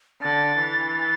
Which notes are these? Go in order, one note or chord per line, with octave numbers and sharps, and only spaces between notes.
D3 A6
E3
A6